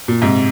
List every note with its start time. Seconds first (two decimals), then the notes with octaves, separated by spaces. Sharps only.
0.08 A#2
0.22 G#2 C3